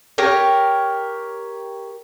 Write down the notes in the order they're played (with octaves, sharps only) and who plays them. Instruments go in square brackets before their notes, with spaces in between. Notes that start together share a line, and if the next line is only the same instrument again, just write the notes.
[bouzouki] G4 A#4 C#5